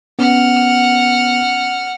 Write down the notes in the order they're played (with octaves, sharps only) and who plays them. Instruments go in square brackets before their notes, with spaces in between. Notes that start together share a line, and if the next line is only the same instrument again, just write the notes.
[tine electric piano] B3 C#4 [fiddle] F#5 F6